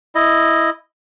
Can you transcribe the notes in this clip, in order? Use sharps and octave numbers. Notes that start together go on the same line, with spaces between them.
E4 D#5